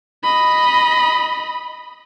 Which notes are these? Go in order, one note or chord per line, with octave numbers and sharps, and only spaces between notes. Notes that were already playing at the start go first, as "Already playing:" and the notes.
D#5 B5